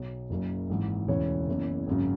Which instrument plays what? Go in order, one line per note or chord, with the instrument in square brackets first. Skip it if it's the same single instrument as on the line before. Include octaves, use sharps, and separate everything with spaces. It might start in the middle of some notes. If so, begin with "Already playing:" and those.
Already playing: [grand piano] B1 B2 C#5
F#1 F#2 C#3
G#1 G#2 E3
E1 D2 C#3 E3 C#5
F#1 E2 C#3 E3
G#1 F#2 C#3